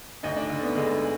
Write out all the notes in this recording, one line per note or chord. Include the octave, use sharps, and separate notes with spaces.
D2 D#4
D4
D3
B3
D3 G#3
G#3